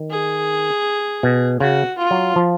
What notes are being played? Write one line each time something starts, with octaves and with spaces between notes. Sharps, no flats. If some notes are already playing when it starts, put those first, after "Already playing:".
Already playing: D#3
G#4
B2
C#3 F#4
F4
F#3
F3